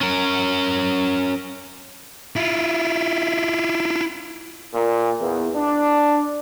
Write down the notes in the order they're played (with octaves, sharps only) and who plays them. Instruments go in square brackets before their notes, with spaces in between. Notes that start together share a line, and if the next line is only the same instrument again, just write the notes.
[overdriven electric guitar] C#4 A#4
[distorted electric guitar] E4 F4
[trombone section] A#2
E2
D4